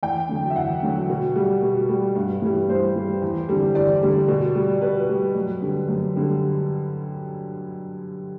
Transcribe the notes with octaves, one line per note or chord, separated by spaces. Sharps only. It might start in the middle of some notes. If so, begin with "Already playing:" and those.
E2 G5
D3 F#3
E5
E2 F#5
D3 F#3
B2
G3
B2
G3
G2
E3 G3
G2 C5
E3 G3
E2
D3 G3
E2 D5
D3 G3
B2
G3
B2 B4
G3
F#2
D3 G3
F#2
D3 G3